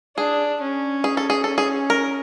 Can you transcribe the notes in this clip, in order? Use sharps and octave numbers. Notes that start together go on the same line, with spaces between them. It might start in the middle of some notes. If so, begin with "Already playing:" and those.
D4 G#4
C#4
G#4
A4
G#4
C#4 A4
G#4
A#4